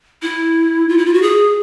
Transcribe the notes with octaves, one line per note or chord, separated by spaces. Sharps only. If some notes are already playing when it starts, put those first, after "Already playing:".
E4
F4
E4
F4
F#4
G#4